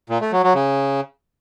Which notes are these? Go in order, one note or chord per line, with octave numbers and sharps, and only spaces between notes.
A#2
A3
F#3
F#3
C#3